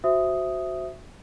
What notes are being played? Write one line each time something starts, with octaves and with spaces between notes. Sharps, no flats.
F#4 C5 E5 D#6